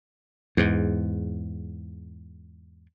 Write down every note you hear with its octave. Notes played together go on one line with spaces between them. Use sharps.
E2 G#2